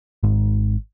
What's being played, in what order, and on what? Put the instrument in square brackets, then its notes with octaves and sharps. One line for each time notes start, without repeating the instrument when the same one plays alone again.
[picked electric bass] G#1 G#2